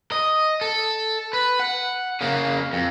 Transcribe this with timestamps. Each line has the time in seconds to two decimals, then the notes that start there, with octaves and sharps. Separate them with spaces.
0.12 D#5
0.61 A4
1.33 B4
1.59 F#5
2.21 C#3 A#3
2.73 F2